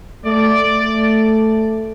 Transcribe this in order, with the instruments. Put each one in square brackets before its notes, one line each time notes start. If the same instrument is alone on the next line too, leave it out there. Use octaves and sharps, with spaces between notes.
[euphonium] A3 [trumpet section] D5
[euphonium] A3